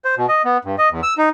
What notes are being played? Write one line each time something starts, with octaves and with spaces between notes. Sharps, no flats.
C5
B2
D#5
B3
G2
D#5
E2
E6
D#4